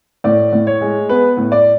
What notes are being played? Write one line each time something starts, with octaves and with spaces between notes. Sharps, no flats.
A2 D5
A2
C#5
G#3
B3 B4
A2
D5